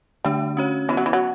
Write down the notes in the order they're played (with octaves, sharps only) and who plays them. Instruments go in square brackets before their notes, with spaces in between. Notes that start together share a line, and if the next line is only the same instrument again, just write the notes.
[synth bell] D3 A3 D4 [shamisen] G3
[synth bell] C#4 F#4 C#5
[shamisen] E3 [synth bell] B3 F#4 C#5
[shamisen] F#3
E3
F#3